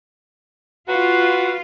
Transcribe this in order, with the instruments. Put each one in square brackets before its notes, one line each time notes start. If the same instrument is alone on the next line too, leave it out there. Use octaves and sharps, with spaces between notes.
[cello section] F4 [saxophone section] F#4 B4